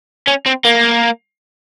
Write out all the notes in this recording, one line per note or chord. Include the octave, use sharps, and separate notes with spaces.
C#4
C4
A#3